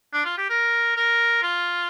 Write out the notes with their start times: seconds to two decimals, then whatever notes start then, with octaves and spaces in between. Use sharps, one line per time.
0.13 D4
0.25 F4
0.38 G4
0.50 A#4
0.97 A#4
1.43 F4